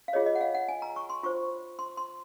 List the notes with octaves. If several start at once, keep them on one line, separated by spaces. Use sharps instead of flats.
F5
F4 G#4 C#5 D#5
D#5
F#5
F5
F#5
G#5
A#5
C#6
C6
F4 C5 C#6
C6
C6